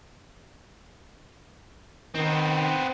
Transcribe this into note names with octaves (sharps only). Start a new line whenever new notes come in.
D#3 B3 C4